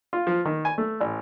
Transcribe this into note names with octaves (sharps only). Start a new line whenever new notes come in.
F4
F3
D#3
G#5
A3
A1